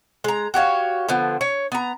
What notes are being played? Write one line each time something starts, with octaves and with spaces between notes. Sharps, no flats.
G#3 A#5
F#4 G4 C#5 F5
D3 F3 B3
C#5
B3 A#5